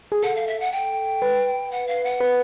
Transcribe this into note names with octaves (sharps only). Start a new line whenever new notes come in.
G#4
A4 F#5
F5
E5
F#5
G5
B4
F#5
F5
F#5
B4